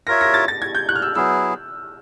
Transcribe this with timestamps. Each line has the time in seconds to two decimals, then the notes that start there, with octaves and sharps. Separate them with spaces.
0.07 F4 A#4 C#5 E5 A#6
0.21 A#6
0.34 A6
0.48 A6
0.62 G#6
0.75 G6
0.89 F#6
0.95 F6
1.02 E6
1.15 F#3 B3 E4 G#4 E6